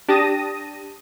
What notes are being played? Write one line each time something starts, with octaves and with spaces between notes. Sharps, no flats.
D4 G4 A5 D#6 A#6 D#7